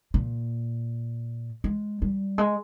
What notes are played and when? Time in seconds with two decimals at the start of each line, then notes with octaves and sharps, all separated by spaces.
0.14 A#2
1.64 G#3
2.02 G3
2.38 G#3